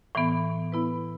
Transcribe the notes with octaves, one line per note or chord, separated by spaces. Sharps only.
A2 E3 B3
B3 E4 B4